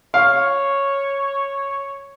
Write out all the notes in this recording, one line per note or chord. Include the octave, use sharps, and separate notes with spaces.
C#5 F5